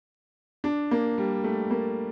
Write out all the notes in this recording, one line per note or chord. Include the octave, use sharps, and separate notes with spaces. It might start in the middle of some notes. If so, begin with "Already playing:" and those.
D4
A#3
G3
A3
A#3